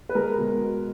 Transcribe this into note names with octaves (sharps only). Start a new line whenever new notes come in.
B4
G#3 A#4
B2